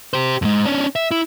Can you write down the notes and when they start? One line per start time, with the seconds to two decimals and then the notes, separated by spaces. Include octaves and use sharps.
0.13 G4 C5
0.42 F2 G#2
0.65 C#4 D4
0.96 E5
1.11 E4